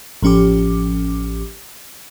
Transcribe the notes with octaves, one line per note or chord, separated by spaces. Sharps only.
A1 F3 C#4 G4 D6